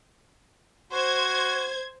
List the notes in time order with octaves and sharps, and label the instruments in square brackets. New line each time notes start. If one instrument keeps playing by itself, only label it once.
[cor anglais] F#4 [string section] C5 G#6